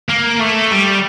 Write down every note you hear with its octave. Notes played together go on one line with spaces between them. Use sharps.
A#3
A3
G3